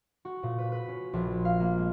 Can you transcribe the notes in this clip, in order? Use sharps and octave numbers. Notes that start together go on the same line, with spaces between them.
F#4
A#2
B4
B4
C#4
A#1
F5
A#3
G#3